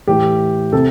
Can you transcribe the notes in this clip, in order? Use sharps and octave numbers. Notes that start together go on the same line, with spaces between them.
A2 E3 G4
C3 A4